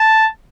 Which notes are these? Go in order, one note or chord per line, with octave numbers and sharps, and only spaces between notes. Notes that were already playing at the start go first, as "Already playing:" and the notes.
Already playing: A5